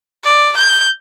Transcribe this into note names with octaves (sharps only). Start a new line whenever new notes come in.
D5
G6